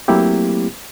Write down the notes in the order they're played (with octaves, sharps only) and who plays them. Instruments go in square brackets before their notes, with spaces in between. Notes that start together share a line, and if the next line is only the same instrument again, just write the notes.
[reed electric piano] F#3 A3 A#3 C4 E4 G4